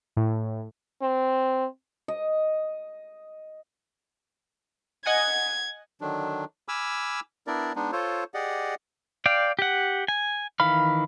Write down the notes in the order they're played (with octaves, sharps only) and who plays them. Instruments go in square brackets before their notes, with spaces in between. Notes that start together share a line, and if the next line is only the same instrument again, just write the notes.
[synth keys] A2
[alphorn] C4
[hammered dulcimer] D#5
[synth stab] D#5 F#5 G#5 [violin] G#6
[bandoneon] D3 D#3 F#3 D4
G#5 B5 D6 E6 F6
B3 D4 E4 A#4 D5
G#3 B3 D4 D#4
F4 A4 C5 C#5
G4 G#4 D5 D#5 F#5
[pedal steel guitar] D5 F5 G5
G4 F#5
G#5
D#3 E3 F5 B5 F6